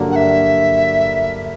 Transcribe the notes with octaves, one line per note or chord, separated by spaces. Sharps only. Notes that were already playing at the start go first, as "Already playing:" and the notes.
Already playing: G2 D3 F#3 A#3
F#5
E5